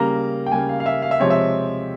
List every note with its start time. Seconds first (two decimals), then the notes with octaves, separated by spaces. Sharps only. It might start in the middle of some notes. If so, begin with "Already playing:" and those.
Already playing: C#3 G3 A#3 A#5
0.46 G5
0.52 C#3 G3 A#3 G#5
0.69 F5
0.80 F5
0.86 E5
1.02 F5
1.11 E5
1.20 C3 F3 G#3 C4 C#5
1.30 E5